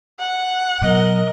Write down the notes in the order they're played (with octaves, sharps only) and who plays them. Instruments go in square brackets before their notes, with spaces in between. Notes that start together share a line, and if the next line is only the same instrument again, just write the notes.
[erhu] F#5
[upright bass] B2 F#3 [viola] A#4 D#5